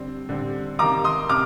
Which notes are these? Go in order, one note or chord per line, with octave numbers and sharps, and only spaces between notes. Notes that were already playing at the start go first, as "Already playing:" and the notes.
Already playing: D3 G3 C4
D3 G3 C4
C3 D#3 A#3 A#5 D6
C6 D#6
C3 D6 F6